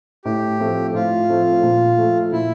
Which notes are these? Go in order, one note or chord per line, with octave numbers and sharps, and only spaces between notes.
A2 G4
F3 A3 C4
A2 F4
F3 A3 C4
A#2
F3 A3
A#2 E4